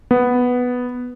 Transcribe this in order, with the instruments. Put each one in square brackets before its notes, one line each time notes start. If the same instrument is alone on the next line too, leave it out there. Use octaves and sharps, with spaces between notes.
[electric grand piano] B3